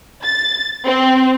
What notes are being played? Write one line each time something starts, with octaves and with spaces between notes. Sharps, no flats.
A6
C4